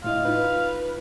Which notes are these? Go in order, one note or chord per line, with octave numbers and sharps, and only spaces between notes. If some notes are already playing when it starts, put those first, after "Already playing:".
A2 E4 D#5 F5
D#4 F4 B4